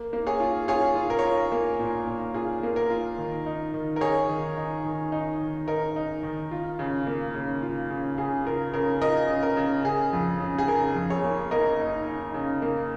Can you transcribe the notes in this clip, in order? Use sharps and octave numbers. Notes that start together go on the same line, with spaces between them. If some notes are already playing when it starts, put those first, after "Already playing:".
Already playing: A#3
A#3
G#4 C#5
F4
F4 G#4 C#5
F4
A#4
C#5
F4 A#4
A#3
A#2
A#2
F4 G#4
A#3
A#4
F4
D#3
D#4
D#3
A#4
D#4 G#4 C#5
D#3
D#4
D#3
D#4
D#3
D#4 A#4
D#4
D#3
F4
C#3
A#3
C#3
F4
C#3
C#3 G#4
F4 A#4
C#3 A#4
F4 A#4 D#5
C#3
A#4
C#3
C#3 G#4
F2
C#3
G#4
C#3 A#4
F2
G#4 C#5
A#3
A#3 A#4 D#5
D#4
D#4
C#3
A#3